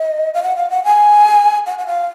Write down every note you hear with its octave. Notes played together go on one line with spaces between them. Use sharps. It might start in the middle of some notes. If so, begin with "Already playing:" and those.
Already playing: D#5
F5
F#5
F5
F#5
G#5
F#5
F#5
F5